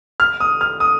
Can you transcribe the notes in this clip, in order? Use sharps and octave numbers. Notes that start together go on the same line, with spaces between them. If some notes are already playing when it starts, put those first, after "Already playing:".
F6
D#6
F6
D#6